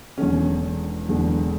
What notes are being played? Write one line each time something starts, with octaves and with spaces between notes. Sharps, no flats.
E1 E2 D3 C#4
E1 E2 D3